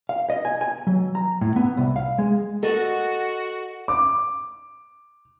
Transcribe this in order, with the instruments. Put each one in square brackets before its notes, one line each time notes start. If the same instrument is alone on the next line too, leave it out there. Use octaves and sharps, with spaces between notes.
[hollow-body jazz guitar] F5
D#5
G#5
G#5
F#3
A#5
A2
B3
C2
F5
G#3
[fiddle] F#4 [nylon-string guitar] A4 D#5
[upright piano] D6